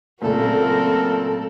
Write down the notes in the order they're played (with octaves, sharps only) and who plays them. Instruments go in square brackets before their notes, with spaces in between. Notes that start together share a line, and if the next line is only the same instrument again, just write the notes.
[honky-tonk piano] A#2 C#3 A3 [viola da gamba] F#3 C4 [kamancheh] A4 [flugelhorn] A#4